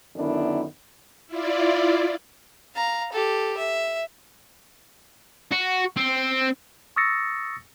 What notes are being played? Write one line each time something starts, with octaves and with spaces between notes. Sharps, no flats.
F#2 D3 D#3 B3 D4 E4
E4 F4 D5
F5 A#5
G4 A4
E5
F#4
C4
C#6 D#6 E6 A6 A#6 C#7